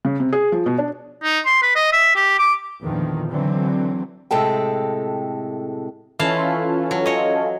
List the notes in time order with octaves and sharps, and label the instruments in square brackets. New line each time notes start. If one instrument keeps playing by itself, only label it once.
[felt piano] C#3
C3
G#4
F3
B2
D4
[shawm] D#4
C6
B4
D#5
E5
G4
D6
[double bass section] E2 A#2 D3 D#3 F3
D3 E3 F#3 C4
[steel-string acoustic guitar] A2 C3 G#3 A4 G5
[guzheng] E3 F5 A5 [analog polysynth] C#4 F4 A4
[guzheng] F#3
C#5 D#5